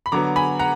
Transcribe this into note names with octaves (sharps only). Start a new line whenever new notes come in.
B5
D3 F#3 B3 A#5 D6
G#5 B5
F#5 A#5